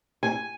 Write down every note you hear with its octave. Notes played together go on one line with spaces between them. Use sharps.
G#5